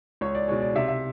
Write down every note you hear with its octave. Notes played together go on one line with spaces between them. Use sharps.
C#2 C#5
D5
B2 G#3 C#5
D5
C3 E5
E5